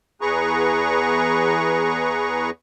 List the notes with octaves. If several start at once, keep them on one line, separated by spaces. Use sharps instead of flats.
E2 G#4 B4 A#5 C#6